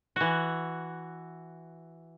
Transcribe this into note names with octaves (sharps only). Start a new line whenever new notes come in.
E3 F#4